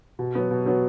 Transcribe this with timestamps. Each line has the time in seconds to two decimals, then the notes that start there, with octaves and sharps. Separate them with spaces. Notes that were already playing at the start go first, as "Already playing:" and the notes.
0.19 B2
0.35 F#3 B3
0.51 B2
0.66 F#3 B3